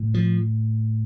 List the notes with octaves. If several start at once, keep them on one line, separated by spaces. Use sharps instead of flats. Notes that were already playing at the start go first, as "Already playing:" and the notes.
Already playing: A2
F3